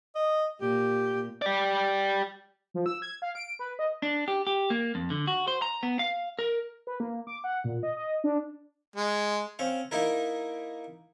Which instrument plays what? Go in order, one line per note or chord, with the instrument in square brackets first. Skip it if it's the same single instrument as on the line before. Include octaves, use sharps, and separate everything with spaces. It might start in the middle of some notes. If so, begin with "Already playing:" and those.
[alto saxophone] D#5
[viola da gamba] A#2 [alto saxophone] G4
[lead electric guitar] G4 D5
[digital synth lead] F3
E6
G#6
F5
D7
B4
D#5
[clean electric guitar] D4
G4
G4
A#3
F2
D3
F#4
C5
A#5
B3
F5
A#4
[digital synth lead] B4
A#3
D6
F#5
A#2
D#5
D#5
D4
[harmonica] G#3
[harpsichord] C4 C#4 F5
A#3 D#4 E4 A#4